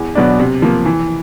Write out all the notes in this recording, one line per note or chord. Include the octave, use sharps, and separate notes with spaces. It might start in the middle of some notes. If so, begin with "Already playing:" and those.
Already playing: E2
B2 F#3 B3 D4
C3
F3 A#3
E3